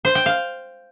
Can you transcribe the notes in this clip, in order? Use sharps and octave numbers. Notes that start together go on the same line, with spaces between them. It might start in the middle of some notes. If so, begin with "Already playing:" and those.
C5
G5
F5